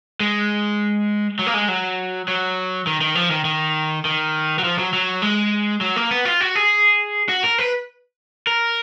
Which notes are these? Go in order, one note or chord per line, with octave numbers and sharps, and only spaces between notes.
G#3
F#3
A#3
G#3
F#3
F#3
D#3
D#3
F3
D#3
D#3
D#3
F#3
F3
F#3
F#3
G#3
F#3
A#3
B3
F4
F#4
G#4
F#4
A#4
B4
A#4